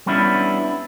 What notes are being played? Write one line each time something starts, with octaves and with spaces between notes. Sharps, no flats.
G3 B3 C#4 D4 E4